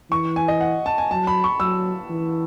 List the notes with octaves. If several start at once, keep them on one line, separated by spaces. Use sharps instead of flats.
E3 C#6
G#5
D#5
F#5
A5
G#5
F#3 A5
B5
C#6
F#3 E6
E3